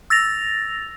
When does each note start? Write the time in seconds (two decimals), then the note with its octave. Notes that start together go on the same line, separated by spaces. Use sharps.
0.10 E6 A6 A#6 F7